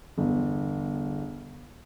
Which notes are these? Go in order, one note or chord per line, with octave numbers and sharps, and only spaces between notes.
G1 E2